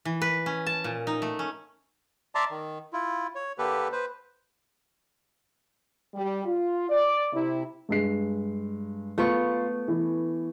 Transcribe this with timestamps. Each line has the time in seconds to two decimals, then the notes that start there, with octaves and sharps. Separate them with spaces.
0.05 E3
0.22 B4
0.46 C#4
0.66 A5
0.84 A#2
1.07 D#4
1.22 A3
1.39 C#4
2.35 D5 E5 A5 A#5 C6 D6
2.51 D#3
2.93 E4 F4
3.35 C#5
3.58 D3 A#3 G4 A4 B4
3.92 B4 C5
6.14 G3 G4
6.45 F4
6.89 D5
7.33 C3 E4
7.89 G2 G#3 C7
9.18 A3 B3 F4 C#6
9.88 E3